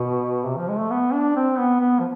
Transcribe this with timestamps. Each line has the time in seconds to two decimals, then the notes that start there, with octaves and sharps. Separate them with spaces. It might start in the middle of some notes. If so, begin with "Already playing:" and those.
Already playing: B2
0.45 C3
0.58 F3
0.69 G#3
0.79 A3
0.91 B3
1.13 D4
1.36 C4
1.59 B3
1.81 B3
2.00 F3